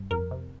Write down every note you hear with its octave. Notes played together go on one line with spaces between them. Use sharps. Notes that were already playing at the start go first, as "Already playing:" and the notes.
Already playing: G2
F2 A#4
C3